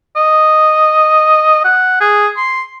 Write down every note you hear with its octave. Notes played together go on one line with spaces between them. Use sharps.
D#5
F#5
G#4
C6